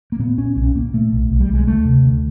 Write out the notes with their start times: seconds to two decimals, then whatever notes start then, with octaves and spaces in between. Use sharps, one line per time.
0.12 A#3
0.19 A#2 B3
0.38 A#2 C#4
0.56 B1 C#4
0.76 A#2 A#3
0.93 A#2 A3
1.13 B1
1.30 B1
1.40 G3
1.49 B1
1.54 G#3
1.67 D2 A3
1.85 C3
2.05 D2